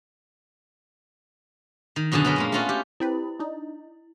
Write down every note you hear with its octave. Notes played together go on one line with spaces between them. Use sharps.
D#3
F#2 B2 D3 G#4 A5
B3 C#4 A#4 B5
A#2 G#3 A#3
A3 B3 C#4 F4 F#4
G4
C4 E4 G4 B4
D4 D#4